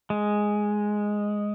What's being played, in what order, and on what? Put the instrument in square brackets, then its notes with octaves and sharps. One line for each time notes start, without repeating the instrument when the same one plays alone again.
[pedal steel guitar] G#3